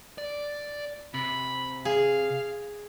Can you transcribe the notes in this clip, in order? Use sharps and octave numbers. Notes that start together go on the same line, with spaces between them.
D5
C3 B5
G#4 F5